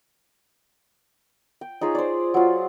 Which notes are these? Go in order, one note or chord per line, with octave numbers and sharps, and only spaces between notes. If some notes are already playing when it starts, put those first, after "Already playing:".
G5
D#4 F4 G#4 C#5
C5 D5
F#3 F4